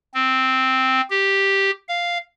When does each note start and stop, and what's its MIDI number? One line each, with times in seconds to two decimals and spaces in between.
0.14 1.01 60
1.10 1.71 67
1.88 2.18 77